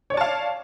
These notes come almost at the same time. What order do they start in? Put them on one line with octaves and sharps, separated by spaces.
C#5 D5 A5 F5